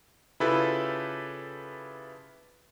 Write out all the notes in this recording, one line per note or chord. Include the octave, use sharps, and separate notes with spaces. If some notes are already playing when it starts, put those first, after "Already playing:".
C#3 E4 F4 G4 A4 B4